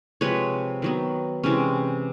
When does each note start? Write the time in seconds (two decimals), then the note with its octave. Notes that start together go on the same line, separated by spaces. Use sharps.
0.21 C3 F3 G#3 B4 C#5
0.82 D#3 F#3 B3
1.44 C3 E3 G#3 C#4